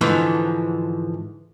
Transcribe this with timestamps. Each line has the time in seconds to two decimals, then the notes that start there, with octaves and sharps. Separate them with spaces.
0.01 G#2 D3 E3 F3